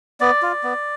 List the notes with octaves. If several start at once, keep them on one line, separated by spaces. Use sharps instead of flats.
B3 D5
F4
B3